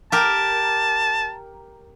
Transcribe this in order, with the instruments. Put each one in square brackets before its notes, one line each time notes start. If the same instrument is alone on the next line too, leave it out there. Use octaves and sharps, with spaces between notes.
[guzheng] G4 A#4 [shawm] A5